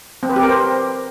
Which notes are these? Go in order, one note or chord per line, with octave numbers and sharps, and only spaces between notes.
C4
B4
G4
A#4
C5